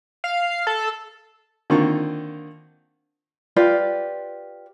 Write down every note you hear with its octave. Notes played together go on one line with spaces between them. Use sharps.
F5
A4
D3 D#3 A#3 C4 F4 C#6
F4 G4 B4 D5